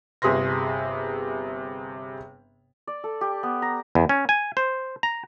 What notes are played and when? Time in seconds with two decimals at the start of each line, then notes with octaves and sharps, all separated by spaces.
0.22 G1 C3 G#4 B4 C6 A#6
2.87 D5
3.04 A4
3.21 G4
3.43 B3
3.62 A#5
3.95 E2
4.09 C#4
4.29 G#5
4.57 C5
5.03 A#5